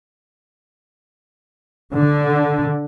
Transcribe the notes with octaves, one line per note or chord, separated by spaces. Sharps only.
D3